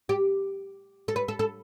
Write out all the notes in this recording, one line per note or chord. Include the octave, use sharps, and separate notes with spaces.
G4
A4
B4
A4
A4